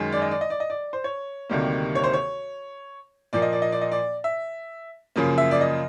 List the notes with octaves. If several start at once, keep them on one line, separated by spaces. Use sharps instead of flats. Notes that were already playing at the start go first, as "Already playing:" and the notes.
Already playing: F#2 D#3 G#3
D5
D#5
D5
D#5
D5
D#5
D5
C5
C#5
D2 C3 D#3 G3 A#3
C#5
C5
C#5
A#2 F3 A#3 D5
D#5
D5
D#5
D5
D#5
D5
E5
F#2 C#3 F3 A#3
E5
D5
D#5